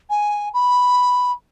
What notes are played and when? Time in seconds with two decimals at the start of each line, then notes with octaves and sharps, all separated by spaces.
0.10 G#5
0.53 B5